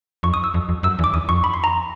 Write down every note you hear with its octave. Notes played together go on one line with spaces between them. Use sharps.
F2 C#6
D#6
E6
F2
F2
F#2 E6
E2
D6
E2 D#6
F2 C#6
B5
C6
A#5